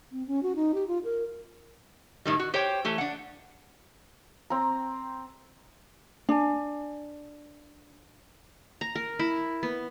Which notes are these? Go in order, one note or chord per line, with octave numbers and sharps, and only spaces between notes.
C4
C#4
F#4
D#4
G4
F4
A#4
A2 D#3 G3
F#4
G4 C5 C#5 G5
E3 A3 G4
D4 F#5
C4 A#5
D4 G#5
A#5
A#4
E4
B3